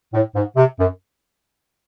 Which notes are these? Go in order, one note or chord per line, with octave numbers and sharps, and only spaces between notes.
A2
G#2
C3
F#2